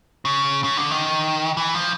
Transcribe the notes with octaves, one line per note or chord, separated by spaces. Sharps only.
C#3
C#3
D3
D#3
E3
F3